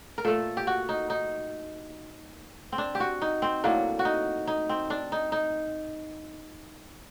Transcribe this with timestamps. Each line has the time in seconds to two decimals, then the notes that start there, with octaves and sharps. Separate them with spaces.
0.18 A#4
0.25 A#2 A3 A4
0.57 G4
0.67 F#4
0.89 D#4
1.10 D#4
2.72 C4
2.78 D4
2.95 G4
3.00 F#4
3.22 D#4
3.42 C4
3.64 A2 F#3 A#3 D4
3.99 F#4
4.05 D#4
4.47 D#4
4.69 C4
4.90 D4
5.12 D#4
5.32 D#4